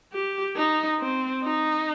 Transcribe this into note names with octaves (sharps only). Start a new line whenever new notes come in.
G4
D#4
C4
D#4